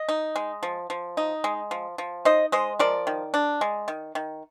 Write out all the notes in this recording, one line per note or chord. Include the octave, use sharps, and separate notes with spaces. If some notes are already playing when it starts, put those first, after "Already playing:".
Already playing: D#5
D#4
G#3
F3
F3
D#4
G#3
F3
F3
D#4 C5 D#5
G#3 C5 D#5
F3 A#4 D5
D#3
D4
G#3
D#3
D#3